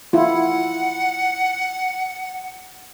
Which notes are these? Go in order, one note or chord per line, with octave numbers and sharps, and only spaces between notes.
E4 F4 F#5